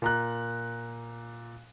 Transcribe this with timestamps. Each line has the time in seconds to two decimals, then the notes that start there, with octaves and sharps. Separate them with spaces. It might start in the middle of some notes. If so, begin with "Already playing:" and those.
0.02 A#2 A#5 F#6